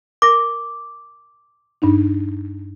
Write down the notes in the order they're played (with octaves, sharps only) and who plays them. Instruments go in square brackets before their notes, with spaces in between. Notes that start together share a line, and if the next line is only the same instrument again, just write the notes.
[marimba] A#4 A#6 [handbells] D6
[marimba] G2 D4 D#4